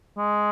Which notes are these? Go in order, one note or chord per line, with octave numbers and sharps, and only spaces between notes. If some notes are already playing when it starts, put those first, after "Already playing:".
G#3